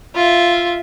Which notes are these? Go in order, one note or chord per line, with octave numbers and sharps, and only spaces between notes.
F4 E5